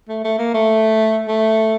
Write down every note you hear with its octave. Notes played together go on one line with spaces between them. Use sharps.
A3
A3
A#3
A3
A3